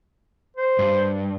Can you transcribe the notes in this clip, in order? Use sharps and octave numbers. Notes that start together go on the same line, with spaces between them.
C5
G2